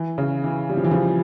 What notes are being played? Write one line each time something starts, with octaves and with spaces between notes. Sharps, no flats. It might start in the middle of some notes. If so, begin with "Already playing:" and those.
Already playing: E3
C#3
E3
G3
F3
E3
C#3 F3